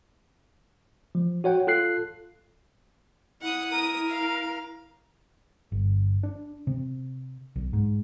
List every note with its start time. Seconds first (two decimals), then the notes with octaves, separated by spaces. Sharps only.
1.15 F3
1.44 F#4 C#5 F#5 G5
1.67 F4 A4 F#6 C7
3.42 E4 F#5 D#6
3.70 A#4 D#6
4.08 F5
5.72 G1
6.23 D4
6.67 C3
7.56 B1
7.73 G#2